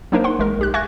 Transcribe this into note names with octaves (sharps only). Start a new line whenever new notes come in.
F#3 A#3 D4 D#4 A#4 C5
F#5 C6
A1 G#3 A#4
B1 G4 F#6
E5 G#5 C#6 F#6 G#6 A#6